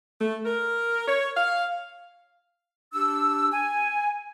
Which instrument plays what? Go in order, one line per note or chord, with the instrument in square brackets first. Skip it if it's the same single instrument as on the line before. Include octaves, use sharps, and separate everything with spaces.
[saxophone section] A3
A#4
C#5
F5
[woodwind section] D4 G4 E6
G#5